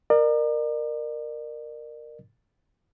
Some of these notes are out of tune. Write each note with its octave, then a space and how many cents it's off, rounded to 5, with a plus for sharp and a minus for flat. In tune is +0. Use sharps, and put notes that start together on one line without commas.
A#4 +0 D5 +40